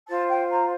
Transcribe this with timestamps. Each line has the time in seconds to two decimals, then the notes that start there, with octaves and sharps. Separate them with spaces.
0.07 F4 C5 A5
0.29 G5
0.49 A#5